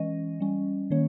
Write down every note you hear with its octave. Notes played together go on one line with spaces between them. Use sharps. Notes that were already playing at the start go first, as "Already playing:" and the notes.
Already playing: E3 G#3 C#4 D#5
G3 C#4
D#3 A#3 C#4 C#5